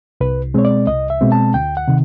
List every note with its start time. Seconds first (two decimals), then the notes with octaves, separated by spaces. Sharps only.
0.21 C2 B4
0.54 B2 G#3 C4 C#5
0.65 D5
0.87 C2 D#5
1.10 E5
1.21 B2 G#3 C4
1.32 A5
1.54 D2 G5
1.77 F#5
1.88 C3 D#3